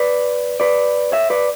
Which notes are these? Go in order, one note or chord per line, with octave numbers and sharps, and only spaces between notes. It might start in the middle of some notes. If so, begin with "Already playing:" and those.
Already playing: B4 D5
B4 D5
C#5 E5
B4 D5